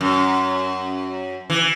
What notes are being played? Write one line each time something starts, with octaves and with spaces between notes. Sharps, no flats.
F#2
E3